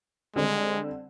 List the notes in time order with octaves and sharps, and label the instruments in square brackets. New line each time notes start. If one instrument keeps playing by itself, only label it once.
[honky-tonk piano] D3 G3 C4 [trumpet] G#3